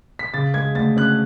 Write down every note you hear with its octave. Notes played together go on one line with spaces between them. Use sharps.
B6
C#3 A6
G#3 G#6
D2 A6
C#4 F#6